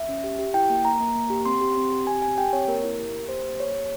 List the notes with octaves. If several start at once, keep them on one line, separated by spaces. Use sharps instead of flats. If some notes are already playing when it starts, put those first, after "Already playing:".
Already playing: E5
C#4
G4
G4
E4 G5
A#3
A#3 A#5
A#3
A#3
G4
C4 C6
G4
C4
G4
C4 G#5
G4 G#5
G4 G5
C4 C#5
A#3 A#4
E4
G4
A#3
G4 C5
A#3
A#3 C#5
G4